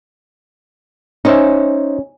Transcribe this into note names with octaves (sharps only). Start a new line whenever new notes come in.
C#4 D#4 C5 E5